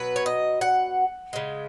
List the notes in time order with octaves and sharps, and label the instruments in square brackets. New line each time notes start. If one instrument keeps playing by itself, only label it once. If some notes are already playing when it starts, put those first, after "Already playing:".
Already playing: [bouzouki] B2 F#3 B4
C#5
D#5
F#5
C#3 G#3